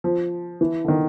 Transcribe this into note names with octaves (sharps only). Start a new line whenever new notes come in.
F3
E3
D3
D#3